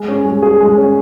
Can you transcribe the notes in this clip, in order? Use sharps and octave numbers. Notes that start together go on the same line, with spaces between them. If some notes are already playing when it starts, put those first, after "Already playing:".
Already playing: G#3
C#4
G#3
G#4
G#3
C#4